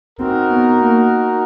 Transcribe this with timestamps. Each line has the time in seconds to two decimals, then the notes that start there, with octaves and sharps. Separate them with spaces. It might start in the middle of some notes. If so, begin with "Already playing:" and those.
0.19 C4 D#4 F#4 A#4
0.50 B3
0.81 A#3